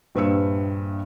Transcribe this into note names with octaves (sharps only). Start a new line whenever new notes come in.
A#1 G2 B4 C5 E6 C#7